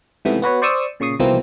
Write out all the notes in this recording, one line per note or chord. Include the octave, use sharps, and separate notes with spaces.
G#2 C3 E3 A3 B3
B3 F#4 B4 C#5
C5 D5 C#6 D#6 E6
A#2 C#3 C#6 D#6 C7
C2 B2 E3 F3 A#3 C4